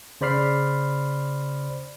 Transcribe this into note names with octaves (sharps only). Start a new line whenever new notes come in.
C#3 C5 D5 B5 F6 C7